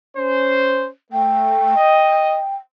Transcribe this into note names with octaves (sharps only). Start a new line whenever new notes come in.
C#4 C5
A3 G5
D#5